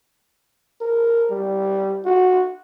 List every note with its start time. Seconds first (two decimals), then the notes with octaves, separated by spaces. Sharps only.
0.81 A#4
1.31 G3
2.05 F#4